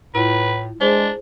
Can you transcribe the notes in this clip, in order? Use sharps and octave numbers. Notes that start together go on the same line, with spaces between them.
A2 E4 F4 B4
G#3 D4 G#4 C5